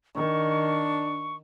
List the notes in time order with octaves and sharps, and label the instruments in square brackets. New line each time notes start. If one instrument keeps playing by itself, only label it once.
[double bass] D#3 [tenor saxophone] D4 [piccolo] C#6